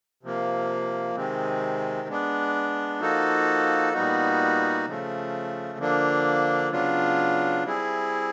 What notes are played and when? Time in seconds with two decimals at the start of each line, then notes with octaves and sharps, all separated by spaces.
0.23 C3 F3 A#3
1.15 C3 D#3 G#3 C4
2.08 G#3 B3 D4
3.00 F3 A#3 D#4 F#4 A4
3.93 A#2 G3 B3 D#4 F#4
4.86 C#3 F3 A3
5.78 D3 F3 A#3 D4
6.71 C#3 F#3 B3 D4 F4
7.64 G3 C4 E4 G#4